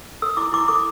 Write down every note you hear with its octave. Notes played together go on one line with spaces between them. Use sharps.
A4 E6
E4 D6
E4 D6
A4 D6